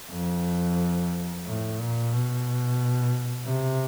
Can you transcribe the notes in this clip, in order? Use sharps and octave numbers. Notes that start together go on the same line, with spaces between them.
F2
A2
A#2
B2
C3